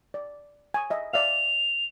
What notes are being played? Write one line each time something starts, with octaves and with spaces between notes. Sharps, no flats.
D5
G#5 C#6 D#6
D#5 E5
D5 E5 F5 F7